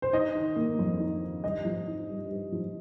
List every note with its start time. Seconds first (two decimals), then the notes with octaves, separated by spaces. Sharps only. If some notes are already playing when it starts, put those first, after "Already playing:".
0.02 C5
0.13 D#4 D#5
0.35 D#3
0.56 A#3
0.79 F2
1.00 D#4
1.22 D#3
1.43 G2 D#5
1.65 F3
1.87 D#4
2.09 G2
2.31 G2
2.52 F3